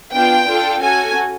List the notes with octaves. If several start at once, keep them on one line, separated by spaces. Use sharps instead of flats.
B3 D4 F4 G5
D4 F4 A4
C#4 F#4 A4 G#5